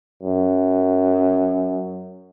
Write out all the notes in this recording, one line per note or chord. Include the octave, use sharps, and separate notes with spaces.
F#2